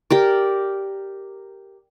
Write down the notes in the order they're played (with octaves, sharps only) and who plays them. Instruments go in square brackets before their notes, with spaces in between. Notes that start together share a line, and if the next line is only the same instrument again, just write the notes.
[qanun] G4 A#4 D5